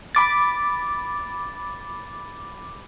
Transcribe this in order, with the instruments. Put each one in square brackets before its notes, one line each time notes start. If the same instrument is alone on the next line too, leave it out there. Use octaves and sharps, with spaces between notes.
[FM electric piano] B5 D6 A6